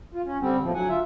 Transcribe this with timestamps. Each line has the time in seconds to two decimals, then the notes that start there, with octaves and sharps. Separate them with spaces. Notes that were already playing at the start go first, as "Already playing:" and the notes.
0.14 F4
0.26 C#4
0.41 D3 G3 C4
0.62 E2 A2 F3
0.74 D3 F#3 F#5 G#5
0.89 F4 E5